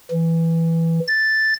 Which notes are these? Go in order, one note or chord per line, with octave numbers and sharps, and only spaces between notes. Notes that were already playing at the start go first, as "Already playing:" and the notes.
E3
A6